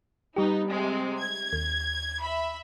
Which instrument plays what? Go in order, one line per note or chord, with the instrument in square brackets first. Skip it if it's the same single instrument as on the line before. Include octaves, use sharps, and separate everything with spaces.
[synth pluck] G3 G4 [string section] B3 D#4
[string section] C3 G#3 C4
G#6
[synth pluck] D#2
[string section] E5 B5